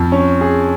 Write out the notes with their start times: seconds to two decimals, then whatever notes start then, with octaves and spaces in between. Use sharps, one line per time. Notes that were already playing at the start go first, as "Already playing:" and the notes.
Already playing: F2
0.12 C#4
0.41 G#4